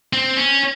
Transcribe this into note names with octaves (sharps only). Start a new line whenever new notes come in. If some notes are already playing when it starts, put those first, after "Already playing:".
C4
C#4